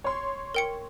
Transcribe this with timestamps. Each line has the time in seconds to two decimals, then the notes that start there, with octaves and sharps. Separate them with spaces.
0.04 C#5 C6
0.55 A#4 G5 C#7